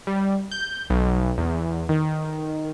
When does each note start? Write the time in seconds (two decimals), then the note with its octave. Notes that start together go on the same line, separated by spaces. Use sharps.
0.07 G3
0.51 G6
0.90 B1
1.38 E2
1.89 D#3